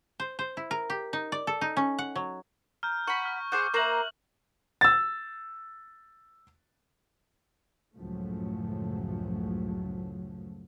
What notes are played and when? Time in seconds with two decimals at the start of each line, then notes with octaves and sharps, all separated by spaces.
0.20 C5
0.39 C5
0.57 E4
0.71 A#4
0.90 G4
1.13 D#4
1.32 D5
1.47 A4
1.61 D#4
1.77 C#4
1.99 F#5
2.16 F#3
2.83 A#5 F6 G6
3.07 F#5 B5 C#6
3.25 F6
3.52 G#4 C5 F#5 D6 G6
3.74 A#3 C5 E5 A#5 C#6 F#6 G6 F#7
4.81 E6 A6
7.95 C#2 F#2 A2 F3 F#3 A3